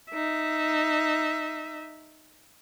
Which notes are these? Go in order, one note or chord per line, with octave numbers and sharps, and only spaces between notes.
D#4 E5